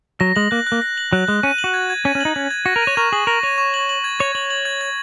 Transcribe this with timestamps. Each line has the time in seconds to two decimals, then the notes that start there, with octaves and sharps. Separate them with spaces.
0.20 F#3 A#6
0.36 G#3 F#7
0.51 A#3 F#6
0.67 F#6
0.72 A#3
0.82 A#6
0.97 F#7
1.13 F#3 F#6
1.28 G#3 F#6
1.43 C#4 D#7
1.58 F#7
1.64 F#4
1.74 G#6
1.90 G#6
2.05 C#4 D#7
2.15 C#4
2.21 D#4 F#7
2.35 C#4 G#6
2.51 G#6
2.66 F#4 A#6
2.76 A#4
2.82 D#7
2.87 C#5
2.97 A#4 C#6
3.12 G#4 F#7
3.27 A#4 A#6
3.43 C#5 D#7
3.58 C#6
3.74 F#7
3.89 F#7
4.04 G#6
4.20 C#5 G#6
4.35 C#5 F#7
4.50 F#7
4.65 G#6
4.81 G#6